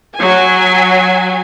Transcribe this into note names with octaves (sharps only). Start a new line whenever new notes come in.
F#3 G#5